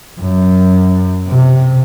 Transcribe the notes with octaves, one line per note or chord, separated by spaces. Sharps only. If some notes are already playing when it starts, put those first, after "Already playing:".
F#2
C3